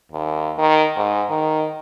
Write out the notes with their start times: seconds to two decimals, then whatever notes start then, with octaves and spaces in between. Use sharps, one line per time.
0.12 D#2
0.58 D#3
0.97 G#2
1.30 D#3